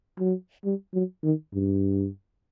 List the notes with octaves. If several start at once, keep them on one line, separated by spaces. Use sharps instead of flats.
F#3
G3
F#3
D#3
G2